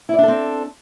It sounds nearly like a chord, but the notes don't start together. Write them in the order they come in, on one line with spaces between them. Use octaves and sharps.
E4 D5 D4 A4 C4